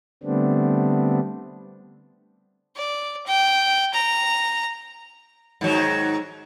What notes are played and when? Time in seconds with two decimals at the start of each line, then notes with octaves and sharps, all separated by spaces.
0.23 D3 G3 A3 B3 C4 D4
2.76 D5
3.26 G5
3.93 A#5
5.61 G#2 D#3 F#3